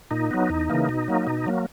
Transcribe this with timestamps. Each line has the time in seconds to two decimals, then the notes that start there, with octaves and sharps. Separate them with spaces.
0.11 A#2 D#4
0.31 F#3 B3
0.50 E2
0.70 C#3 E3 A#3
0.89 B2
1.08 F#3 A#3
1.27 B2
1.46 F#3 A#3